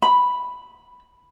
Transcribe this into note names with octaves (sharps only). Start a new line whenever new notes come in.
B5